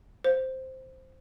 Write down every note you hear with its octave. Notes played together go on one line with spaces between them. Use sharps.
C5